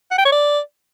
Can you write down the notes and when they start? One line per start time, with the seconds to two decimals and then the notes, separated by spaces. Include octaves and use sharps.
0.11 F#5
0.18 G5
0.25 C#5
0.32 D5